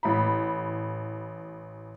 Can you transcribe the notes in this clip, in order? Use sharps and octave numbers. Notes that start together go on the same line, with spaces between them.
A1 B5